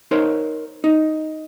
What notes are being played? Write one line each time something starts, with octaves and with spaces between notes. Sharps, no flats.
D#4 A#4 C5 C#5
D#4